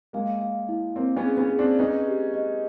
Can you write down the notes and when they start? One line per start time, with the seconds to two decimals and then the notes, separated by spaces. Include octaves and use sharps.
0.13 G#3 A#3 F5
0.41 F5
0.69 E4
0.96 A#3 C4 C#5
1.16 B3 C#4
1.24 G#4
1.37 B3 C#4
1.51 G#4
1.59 C4 D4
1.79 C#4 D#4 B4
2.07 G4
2.34 D#5